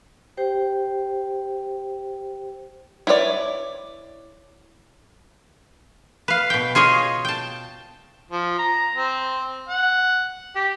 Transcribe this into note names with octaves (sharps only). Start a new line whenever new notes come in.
G4 C5 G5
E4 B4 C#5 D5
B4 F5
B2 G5
F4 G#4 C#5 D#5
G5 A5
F3
A#5
C4
F#5
G4